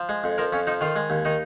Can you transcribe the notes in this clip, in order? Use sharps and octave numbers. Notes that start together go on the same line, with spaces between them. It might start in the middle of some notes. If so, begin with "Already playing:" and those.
Already playing: F3
G#3
F2
F3 A#4
F2 C#4
F3 D#4
D#3 F4
G#3
D#2
D#3 D#4